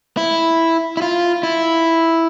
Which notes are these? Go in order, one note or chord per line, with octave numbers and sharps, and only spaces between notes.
E4
E4
F4
E4